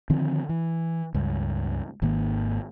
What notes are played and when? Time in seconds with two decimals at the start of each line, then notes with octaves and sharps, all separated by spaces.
0.10 D3 D#3 F3 C4
0.49 E3
1.14 C#2 G2
2.02 G#1 G#2 D#3 A#3